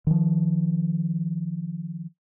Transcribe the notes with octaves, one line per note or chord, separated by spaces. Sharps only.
D#3 F3